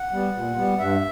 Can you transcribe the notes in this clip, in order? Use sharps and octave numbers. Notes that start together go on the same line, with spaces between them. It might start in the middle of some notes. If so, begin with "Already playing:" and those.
Already playing: F#5
G3 B3
A#2
G3 B3
G2 E5